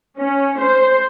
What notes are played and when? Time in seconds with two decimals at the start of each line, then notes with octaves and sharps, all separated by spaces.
0.19 C#4
0.60 C5